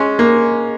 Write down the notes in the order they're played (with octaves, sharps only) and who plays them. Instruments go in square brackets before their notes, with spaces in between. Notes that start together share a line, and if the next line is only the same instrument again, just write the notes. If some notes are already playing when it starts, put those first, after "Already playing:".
Already playing: [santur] G#3 [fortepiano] C#4
[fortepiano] A#3